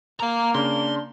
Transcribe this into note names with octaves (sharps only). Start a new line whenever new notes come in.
A#3 F5 A#5
C#3 D4 C6